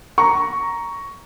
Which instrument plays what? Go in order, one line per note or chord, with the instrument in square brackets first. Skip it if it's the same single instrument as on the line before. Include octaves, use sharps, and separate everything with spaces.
[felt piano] A#5 C#6